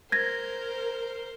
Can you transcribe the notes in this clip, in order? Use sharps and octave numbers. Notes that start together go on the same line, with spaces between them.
A#4 C5 G#6 A#6